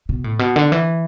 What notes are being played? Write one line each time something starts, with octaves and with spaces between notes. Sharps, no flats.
B2
A2
B2
D3
E3